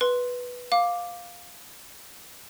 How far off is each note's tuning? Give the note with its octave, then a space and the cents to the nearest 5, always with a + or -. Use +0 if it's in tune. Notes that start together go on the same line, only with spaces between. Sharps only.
B4 -5 C6 +0
F5 +10 D6 +0